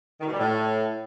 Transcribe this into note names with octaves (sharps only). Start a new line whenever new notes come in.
D#3
B2
G3
A2